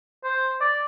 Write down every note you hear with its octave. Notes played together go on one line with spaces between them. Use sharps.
C5
D5